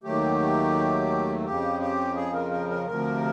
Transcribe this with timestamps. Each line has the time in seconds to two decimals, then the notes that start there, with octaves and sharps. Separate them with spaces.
0.03 D#2 D#3 F#3 A3 G4
1.45 F2 C#3 F3 G4
1.80 G4
2.16 G#4
2.34 A#4
2.51 A#4
2.69 A#4
2.86 D2 C3 F3 A#4